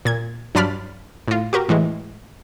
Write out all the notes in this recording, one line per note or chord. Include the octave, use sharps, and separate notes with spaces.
A#2 G#6
G2 F#3 D4 D5 B5 F6
A2 F4
F#4 G4 A#4
A2 E3 G#3